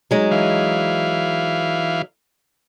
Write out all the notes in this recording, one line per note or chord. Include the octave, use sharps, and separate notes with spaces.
F#3 G#3 D#4
E3 F5